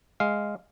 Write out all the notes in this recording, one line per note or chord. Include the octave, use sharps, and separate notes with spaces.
G#3 F5